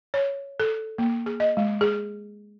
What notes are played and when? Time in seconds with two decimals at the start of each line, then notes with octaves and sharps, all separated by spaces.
0.14 C#5
0.60 A4
0.98 A#3
1.26 G#4
1.40 D#5
1.57 G#3
1.81 G#4